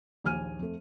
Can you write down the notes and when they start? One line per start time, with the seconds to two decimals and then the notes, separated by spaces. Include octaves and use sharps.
0.24 A#1 D#2 G#5 F6 D#7
0.59 F2 A3